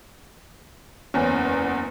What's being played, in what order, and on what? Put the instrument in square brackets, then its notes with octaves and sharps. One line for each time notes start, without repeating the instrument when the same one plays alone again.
[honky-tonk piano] F#1 E2 [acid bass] C#4